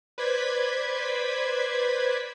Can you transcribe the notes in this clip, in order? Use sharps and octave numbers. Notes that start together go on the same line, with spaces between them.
B4 C5 D5 G#6 B6